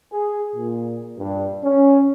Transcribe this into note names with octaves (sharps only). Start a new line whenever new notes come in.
G#4
A#2
G2
C#4